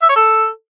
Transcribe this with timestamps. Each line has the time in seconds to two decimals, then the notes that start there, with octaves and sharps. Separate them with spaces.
0.02 E5
0.09 C#5
0.16 A4